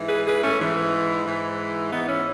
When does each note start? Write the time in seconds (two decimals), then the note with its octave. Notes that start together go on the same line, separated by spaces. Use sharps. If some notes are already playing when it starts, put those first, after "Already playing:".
Already playing: G#2 E3
0.09 G#4 B4
0.26 G#4 B4
0.42 A3 C#4
0.59 G#2 E3
1.26 G#2 E3
1.92 G#2 E3 B3 D#4
2.09 C#4 E4